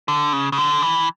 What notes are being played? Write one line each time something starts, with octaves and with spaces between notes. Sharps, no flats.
D3
C#3
C#3
D3
E3